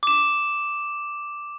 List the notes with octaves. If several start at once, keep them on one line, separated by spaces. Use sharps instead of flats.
D6 E7